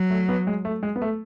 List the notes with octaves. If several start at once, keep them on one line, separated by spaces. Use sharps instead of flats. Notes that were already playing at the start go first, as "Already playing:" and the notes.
Already playing: F#3
A3
B3
G#3
A3
G#3
B3
A3